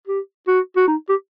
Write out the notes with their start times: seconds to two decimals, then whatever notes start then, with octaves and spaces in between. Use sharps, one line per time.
0.07 G4
0.48 F#4
0.76 F#4
0.88 D#4
1.09 G4